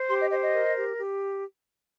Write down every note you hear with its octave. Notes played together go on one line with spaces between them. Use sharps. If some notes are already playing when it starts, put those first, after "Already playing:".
Already playing: C5
G4 C6
D#5
C5 D#5
D#5
A#4
G4
G4